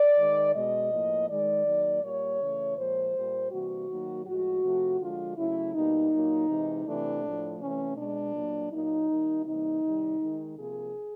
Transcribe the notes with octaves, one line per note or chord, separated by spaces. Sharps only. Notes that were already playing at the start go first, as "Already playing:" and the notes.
Already playing: D5
D#3 G#3
B2 G#3 D#5
A2 F3 A#3
D#3 G#3 D5
D#3 F#3 A#3
A#2 G3 A#3 C#5
C#3 E3 A3
A#2 F3 G#3 C5
A#2 G3 A#3
C3 E3 G3 A#3 F#4
D#3 F#3 A#3
A2 F3 G#3 F#4
C3 F3 A3
D3 F3 G#3 F4
C#3 F#3 A3 E4
B2 G3 A#3 D#4
A#2 F#3 A#3
C3 E3 G#3
C3 E3 A3 D4
A2 F3 A3
C3 E3 A3 C#4
B2 G#3 D4
A#2 F#3 A#3
A#2 F#3 A#3 D#4
D#3 G3 A#3
C3 E3 G3 A#3 D#4
C3 D#3 G3
D#3 G#3
C3 F3 A#3 G#4